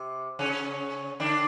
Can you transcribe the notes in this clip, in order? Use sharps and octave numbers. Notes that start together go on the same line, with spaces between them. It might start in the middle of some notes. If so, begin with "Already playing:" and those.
Already playing: C3
C#3 C#4
D3 D4